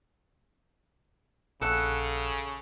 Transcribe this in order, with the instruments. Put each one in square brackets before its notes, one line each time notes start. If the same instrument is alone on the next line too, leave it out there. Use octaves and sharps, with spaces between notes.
[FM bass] A#1 [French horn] C#3 [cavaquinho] A4 F#5